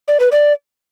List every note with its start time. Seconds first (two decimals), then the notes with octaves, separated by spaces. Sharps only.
0.08 D5
0.20 B4
0.32 D5